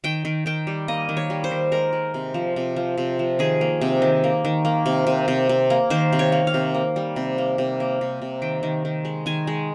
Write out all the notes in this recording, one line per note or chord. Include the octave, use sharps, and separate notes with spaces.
D#3 G5
D#3
D#3 G5
G3
A#3 D#5
D#3
C#5
G3
C5
D#3
G#3 A#4
G#3
C3
F3
C3
F3
C3
F3
D#3 G#4
A#3
C3
D#3
A#3
D#3
A#3
C3
C3
C3
C3
A#3
D#3 C5
C3
C#5
A#3
F5
C3
A#3
G3
C3
A#3
C3
A#3
C3
C3
D#3 G5
D#3
D#3
G#3
D#3 G#5
G#3